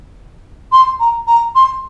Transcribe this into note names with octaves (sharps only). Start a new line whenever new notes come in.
C6
A#5
A#5
C6